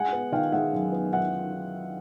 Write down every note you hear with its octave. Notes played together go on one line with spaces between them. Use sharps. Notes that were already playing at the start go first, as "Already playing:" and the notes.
Already playing: G#3 F#5 G#5
B3
D#3 F5 G5
G#3 E5 F#5
F#2
B3
F#2 E5 F#5